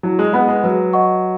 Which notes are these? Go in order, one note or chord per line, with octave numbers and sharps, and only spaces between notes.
F#3 E4
G#3
B3 B4 D#5 F#5 B5
G#3
F#3 B4
D#5 F#5 C#6